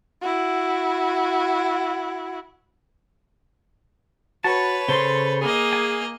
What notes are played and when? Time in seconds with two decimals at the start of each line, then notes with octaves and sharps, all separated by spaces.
0.22 E4 F#4
4.44 F#4 B4 C#5 A5
4.89 C#3 A4 C5 C6
5.41 A#3 G#4 D#5
5.73 G#5